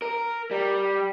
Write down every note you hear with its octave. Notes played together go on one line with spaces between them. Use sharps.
A#4
G3